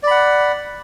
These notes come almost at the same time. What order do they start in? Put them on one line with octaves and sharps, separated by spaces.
D5 B5 F#5